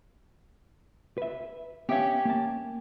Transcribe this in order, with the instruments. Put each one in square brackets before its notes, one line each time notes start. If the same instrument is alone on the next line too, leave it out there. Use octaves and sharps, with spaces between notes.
[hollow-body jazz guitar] B4 E5
[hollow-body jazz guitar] B3 E5 F5 [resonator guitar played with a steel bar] C#4 G4
[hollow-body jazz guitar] A#3 A5